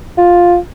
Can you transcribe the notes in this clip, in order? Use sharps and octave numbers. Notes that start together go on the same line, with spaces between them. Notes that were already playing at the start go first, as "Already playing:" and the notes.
F4